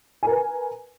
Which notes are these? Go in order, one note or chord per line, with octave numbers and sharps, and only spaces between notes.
A#4 B4 G#5